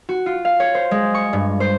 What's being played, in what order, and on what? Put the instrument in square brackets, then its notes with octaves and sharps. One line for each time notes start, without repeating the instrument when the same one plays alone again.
[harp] F#4
F4
F5
C#5
C5
G#3
C#6
G2
C5